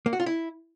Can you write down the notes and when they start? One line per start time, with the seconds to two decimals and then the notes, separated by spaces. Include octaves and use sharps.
0.06 A#3
0.13 F#4
0.20 F4
0.26 E4